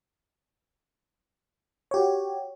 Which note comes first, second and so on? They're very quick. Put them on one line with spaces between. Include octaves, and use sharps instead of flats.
C#5 G4 F#4